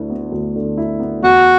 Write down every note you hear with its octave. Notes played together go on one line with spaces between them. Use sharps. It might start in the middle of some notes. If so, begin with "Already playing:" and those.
Already playing: D2 D3 E4
B3
D2
D3
E4
B3
E2 F#4